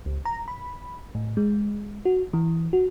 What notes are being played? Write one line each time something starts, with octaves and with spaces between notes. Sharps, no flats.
C#2
A#5
B5
A2
G#3
F#4
E3
F#4